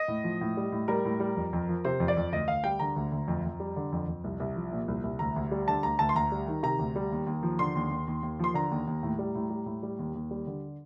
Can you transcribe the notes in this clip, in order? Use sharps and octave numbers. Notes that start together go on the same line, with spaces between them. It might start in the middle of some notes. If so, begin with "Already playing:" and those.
Already playing: D#5
A2
F3
A2
G3
A2
G3 A#4
A2
G3
F2
F2
F3
C3 C5
F2
D5
F2
D2 D#5
D2 F5
G3 G5
D3 A#5
D2
D2
F2
F2
G3
D3
F2
F2
C2
C2
F3
A#2
C2
C2
D2 A#5
D2
G3
D3 A5
D2 A#5
D2 A5
C6
D2 A#5
G3
D#3
C3 A#5
D2
G3
D#2
D#2
F3
D3 C6
D#2
D#2
D#2
D#2
F3 C6
D3 A#5
D#2
D#2
A2
G3
A2
G3
A2
G3
D#2
D#2
G3
D3